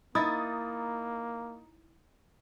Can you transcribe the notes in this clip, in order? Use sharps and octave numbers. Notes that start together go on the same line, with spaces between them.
A#3 D#4 E4 D#6 A6